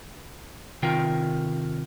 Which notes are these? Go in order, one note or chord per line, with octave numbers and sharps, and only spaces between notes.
C3 D#3 F4 A#4 G5